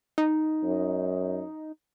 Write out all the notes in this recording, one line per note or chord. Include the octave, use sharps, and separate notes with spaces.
D#4
F#2